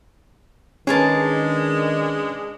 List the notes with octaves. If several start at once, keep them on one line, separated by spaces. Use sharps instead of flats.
D#3 G#3 C#4 D4 G#4 A#4 B4 A5